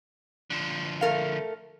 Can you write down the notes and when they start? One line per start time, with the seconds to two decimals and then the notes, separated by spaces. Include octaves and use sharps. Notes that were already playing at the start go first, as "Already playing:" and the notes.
0.50 D3 F3
1.01 A3 A#4 F5